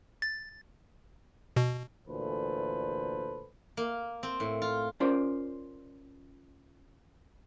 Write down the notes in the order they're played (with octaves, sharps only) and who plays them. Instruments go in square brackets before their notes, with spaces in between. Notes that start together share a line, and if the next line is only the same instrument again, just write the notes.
[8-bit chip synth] A6
B2
[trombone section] D2 A#2 E3 A4 B4 C5
[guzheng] A#3
C4
A2
F4
[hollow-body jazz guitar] C#4 F4 A#4 C5 D5